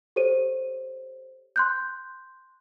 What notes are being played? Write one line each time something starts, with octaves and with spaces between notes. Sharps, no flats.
G4 A4 C5 C#5 D#7
C6 F#6 G6